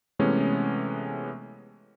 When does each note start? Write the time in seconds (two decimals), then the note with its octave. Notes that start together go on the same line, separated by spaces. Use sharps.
0.19 C3 E3 G#3 A3 B3 C#4